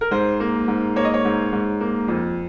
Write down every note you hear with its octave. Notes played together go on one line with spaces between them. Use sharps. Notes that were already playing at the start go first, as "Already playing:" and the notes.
A#4
G#2 C5
A#3
G#2
A#3 C#5
D#5
C#5
G#2
G#2
A#3
F2